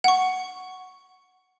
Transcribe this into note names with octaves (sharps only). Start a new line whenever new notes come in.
F#5 C#6